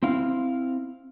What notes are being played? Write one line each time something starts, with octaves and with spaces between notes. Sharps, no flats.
C4 E4 F5